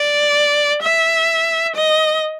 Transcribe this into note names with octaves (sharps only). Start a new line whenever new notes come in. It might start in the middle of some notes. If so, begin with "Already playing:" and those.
Already playing: D5
E5
D#5